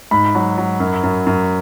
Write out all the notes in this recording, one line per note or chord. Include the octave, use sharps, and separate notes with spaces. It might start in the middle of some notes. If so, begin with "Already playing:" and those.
G#2 B5
F#3
F#3
F#2
F#2
F#2